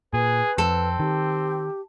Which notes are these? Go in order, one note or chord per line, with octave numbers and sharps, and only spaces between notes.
A#2 G#4 B4
F2 C4 A4
D#3 G4